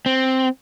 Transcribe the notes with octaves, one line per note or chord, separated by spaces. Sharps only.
C4